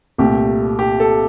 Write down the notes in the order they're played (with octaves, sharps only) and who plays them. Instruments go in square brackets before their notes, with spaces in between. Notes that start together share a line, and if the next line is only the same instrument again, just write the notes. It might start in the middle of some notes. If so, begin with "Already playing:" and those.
[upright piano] C2 A#2 A3 G4
G4
A4